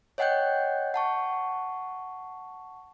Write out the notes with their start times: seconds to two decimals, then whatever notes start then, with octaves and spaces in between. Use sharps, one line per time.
0.18 C#5 D#5 F#5 G5 F#6 G6
0.94 F#5 A5 C#6